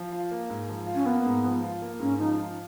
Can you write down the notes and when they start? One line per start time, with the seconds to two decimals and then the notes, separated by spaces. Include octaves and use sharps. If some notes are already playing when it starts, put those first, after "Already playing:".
Already playing: F3
0.12 F4
0.31 A#3
0.50 G#2
0.69 F3
0.87 F4
0.95 C#4
1.06 A#3 B3
1.26 G#2
1.44 F3
1.63 F4
1.82 A#3
2.00 G#2 C#4
2.18 F3 D#4
2.38 F4